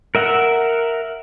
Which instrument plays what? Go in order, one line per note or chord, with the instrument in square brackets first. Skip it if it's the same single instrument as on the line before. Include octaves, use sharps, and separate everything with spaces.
[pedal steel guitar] A#4 E5 F#5